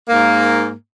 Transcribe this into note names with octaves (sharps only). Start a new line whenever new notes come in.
G#2 A#3